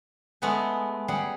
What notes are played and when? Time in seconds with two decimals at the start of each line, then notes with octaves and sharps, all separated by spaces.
0.42 G#3 A3 B3 F#5 G#5
1.08 G3 G#4 F#5